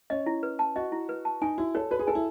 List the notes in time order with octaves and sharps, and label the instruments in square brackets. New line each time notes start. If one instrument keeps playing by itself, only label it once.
[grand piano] C#4 [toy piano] D#5
[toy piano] E4
B4
A5
[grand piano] F#4 [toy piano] D#5
[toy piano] E4
B4
A5
[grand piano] D#4 [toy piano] G#5
[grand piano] E4 [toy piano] F#4
[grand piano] A4 [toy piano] C#5
[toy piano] F#4 [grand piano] B4
[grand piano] G#4
[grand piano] A4 [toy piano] G#5
[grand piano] E4